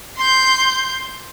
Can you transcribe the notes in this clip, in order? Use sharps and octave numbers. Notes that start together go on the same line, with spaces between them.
C6 G6